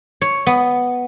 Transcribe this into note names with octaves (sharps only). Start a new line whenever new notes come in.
C#5
B3